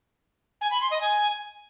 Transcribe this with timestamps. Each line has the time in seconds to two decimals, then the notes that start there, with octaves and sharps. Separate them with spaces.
0.61 G#5
0.71 B5
0.81 C6
0.91 D#5
1.01 G#5